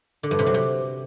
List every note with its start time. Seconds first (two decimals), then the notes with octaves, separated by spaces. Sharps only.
0.23 D3
0.31 G2
0.39 C3
0.46 F#3
0.54 C3